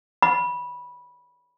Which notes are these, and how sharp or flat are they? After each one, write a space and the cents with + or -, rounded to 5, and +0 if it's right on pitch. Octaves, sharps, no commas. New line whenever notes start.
B5 -15